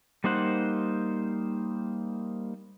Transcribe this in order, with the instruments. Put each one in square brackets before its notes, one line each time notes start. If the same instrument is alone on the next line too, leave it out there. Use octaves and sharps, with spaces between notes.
[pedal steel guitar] G3 A#3 D#4 C5 F#5